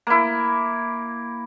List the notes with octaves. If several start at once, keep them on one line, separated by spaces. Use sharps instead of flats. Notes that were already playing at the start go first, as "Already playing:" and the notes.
A#3 E4